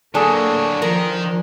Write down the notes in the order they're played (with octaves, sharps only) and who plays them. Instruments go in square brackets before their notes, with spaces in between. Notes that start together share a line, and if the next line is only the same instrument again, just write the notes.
[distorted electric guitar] D3 F#3 [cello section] A#3 [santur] D4 G#4 [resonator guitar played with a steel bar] A4
[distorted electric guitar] D#3 [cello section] F3 [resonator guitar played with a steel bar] A#4